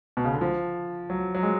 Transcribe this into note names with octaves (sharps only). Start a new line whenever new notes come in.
B2
C#3
D3
F3
F#3
F#3
G#3